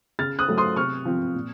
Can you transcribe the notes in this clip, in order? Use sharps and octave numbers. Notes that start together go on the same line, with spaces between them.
C#3 F6 A6
D#6 F#6
F#3 A3
C6 D#6
C3 C#6 F6
F3 C4
A#2